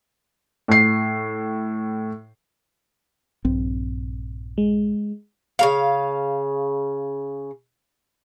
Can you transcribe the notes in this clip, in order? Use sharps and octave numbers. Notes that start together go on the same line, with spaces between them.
A2 C7
A#1 G2 C4
G#3
C#3 G3 F5